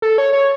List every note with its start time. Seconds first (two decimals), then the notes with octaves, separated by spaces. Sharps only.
0.02 A4
0.18 C#5
0.33 C#5